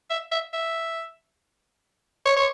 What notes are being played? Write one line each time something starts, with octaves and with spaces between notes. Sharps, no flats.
E5
E5
E5
C#5
C#5